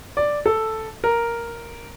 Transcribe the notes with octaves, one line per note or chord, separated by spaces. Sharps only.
D5
A4
A#4